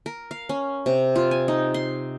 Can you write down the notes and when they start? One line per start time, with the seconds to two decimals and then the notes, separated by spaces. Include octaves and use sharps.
0.06 A#4
0.31 F5
0.49 C#4
0.86 C3
1.16 F4
1.31 G#5
1.48 D#4
1.74 C6